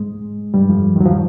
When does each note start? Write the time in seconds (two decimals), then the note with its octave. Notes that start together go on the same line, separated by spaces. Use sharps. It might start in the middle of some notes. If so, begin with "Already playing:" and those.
Already playing: G#2 G#3
0.54 G2 G3
0.69 F2 F3
0.96 D#2 D#3 F#3
1.06 F3